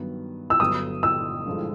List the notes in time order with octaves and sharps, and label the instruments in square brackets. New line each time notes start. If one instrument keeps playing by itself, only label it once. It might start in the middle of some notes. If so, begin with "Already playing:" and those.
Already playing: [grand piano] G2 D#3 F#3 B3
[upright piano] E6
[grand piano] G1 G2 D3 F#3 B3 [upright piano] D#6
[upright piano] E6
[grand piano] G2 D3 F3 G#3